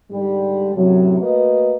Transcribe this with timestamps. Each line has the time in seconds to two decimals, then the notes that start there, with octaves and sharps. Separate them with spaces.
0.11 G#2 D3 G3
0.74 F#2 A2 C3 F#3
1.20 A3 A#3 F#4 B4 D#5